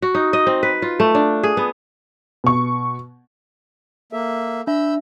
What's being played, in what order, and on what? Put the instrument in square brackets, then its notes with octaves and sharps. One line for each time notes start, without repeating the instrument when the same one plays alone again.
[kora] F#4
D#4
D#5
C4
B4
F4
A3
D4
G#4
B3
[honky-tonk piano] B2 C#6
[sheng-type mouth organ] A#3 E5 [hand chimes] A4
[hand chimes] D4 E5 [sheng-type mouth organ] B5 E6 G6